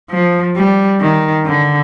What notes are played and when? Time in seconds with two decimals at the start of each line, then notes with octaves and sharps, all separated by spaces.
0.10 F3
0.57 G3
1.01 D#3
1.46 D3